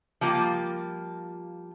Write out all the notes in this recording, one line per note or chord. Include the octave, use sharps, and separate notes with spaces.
F3 G3 A#3 F4